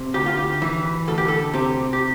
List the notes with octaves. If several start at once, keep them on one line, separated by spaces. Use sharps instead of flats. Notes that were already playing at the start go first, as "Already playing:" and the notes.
Already playing: C3
D2 G4
F4
G4
E3
D2 A4
G4
A4
C3 G4
G4